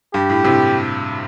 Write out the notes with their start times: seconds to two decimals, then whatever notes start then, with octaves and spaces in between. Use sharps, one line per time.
0.14 G2 G4
0.30 A2
0.44 A2 C3